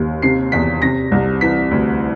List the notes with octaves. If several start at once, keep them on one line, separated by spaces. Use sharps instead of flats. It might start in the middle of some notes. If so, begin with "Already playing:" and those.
Already playing: D#2
C3 C7
E2 B6
C3 A#6
C2
E3 B6
D2